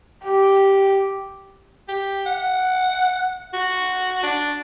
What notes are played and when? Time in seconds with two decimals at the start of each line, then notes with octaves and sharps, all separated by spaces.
0.24 G4
1.88 G4
2.26 F#5
3.53 F#4
4.23 D4